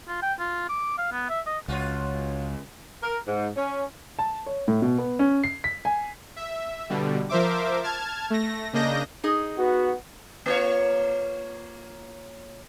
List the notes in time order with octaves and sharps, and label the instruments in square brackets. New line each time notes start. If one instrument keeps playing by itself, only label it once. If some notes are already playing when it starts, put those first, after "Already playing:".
[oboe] F4
G5
F4
D6
F5
B3
E5
D#5
[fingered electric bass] C#2 [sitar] F4 F#4 C#5
[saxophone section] A#4
G#2
C#4
[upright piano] A5
C#5
A2
B2
B3
C#4
C7
B6
G#5
[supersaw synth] E5
B2 D3 G3
F3 A#4 C5 E5 D6
A5 F6 G#6
A3 A#6
C#3 A#3 D4 D#5 G6 A#6
[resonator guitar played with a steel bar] D#4 G#4 D#5
[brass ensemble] B3 F#4
[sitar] A#3 F4 C#5